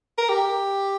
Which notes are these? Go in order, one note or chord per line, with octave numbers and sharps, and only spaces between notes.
A#4
G4